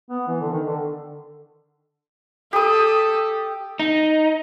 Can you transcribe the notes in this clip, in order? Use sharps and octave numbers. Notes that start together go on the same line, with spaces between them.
B3
E3
D3
D#3
D3
G4 A4 D#6
D#4